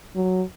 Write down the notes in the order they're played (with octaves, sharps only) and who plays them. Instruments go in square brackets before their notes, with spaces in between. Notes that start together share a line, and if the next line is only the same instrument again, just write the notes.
[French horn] F#3